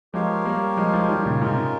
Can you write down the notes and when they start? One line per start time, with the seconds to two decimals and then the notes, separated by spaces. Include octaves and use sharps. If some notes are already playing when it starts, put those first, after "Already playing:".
0.14 F3 G#3 G4 A#4 C#5 F5
0.45 G3 A#3
0.77 F3 G#3
0.93 F3 G#3
1.09 D#3 G3
1.21 D#3
1.26 A#2 C#3
1.41 G#2 C3 G#3 C#4 F4 A#4
1.57 C3